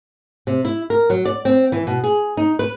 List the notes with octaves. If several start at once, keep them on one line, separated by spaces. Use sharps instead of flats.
C3
E4
A#4
F#3
D5
C4
E3
B2
G#4
D#4
B4